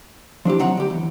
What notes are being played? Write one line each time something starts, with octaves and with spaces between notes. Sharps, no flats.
F3 D4 E4 G4
C3 F#3 D#4 C#5 F#5 A#5
D2 G4
E2